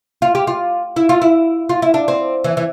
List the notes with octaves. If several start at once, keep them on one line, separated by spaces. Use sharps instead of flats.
F4
G4
F4
E4
F4
E4
F4
E4
D4
C4
E3
E3